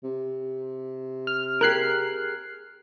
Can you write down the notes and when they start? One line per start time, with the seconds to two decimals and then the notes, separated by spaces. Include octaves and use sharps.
0.04 C3
1.27 F6
1.61 G4 G#4 A#4 F6 F#6 C7